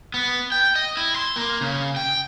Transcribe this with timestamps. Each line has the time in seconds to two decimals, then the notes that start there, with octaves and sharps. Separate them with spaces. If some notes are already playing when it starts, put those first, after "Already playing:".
0.14 B3
0.52 G5
0.76 D#5
0.97 E4
1.16 C6
1.36 A#3
1.61 C#3
1.96 G5